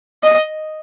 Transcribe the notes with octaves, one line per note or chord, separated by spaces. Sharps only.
D#5